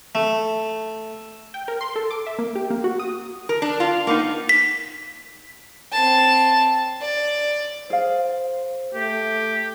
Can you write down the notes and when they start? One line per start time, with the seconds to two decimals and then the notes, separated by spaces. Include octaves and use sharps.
0.15 A3
1.54 G5
1.68 A#4
1.81 C6
1.96 A4
2.11 D6
2.26 E5
2.39 A#3
2.55 G4
2.70 A#3
2.84 F#4
2.99 D#6
3.49 A#4
3.62 D4
3.80 F4
4.07 A#3 B3 D#4
4.49 B6
5.92 C4 A5
7.01 D5
7.90 G#4 C5 F5
8.93 A3 G4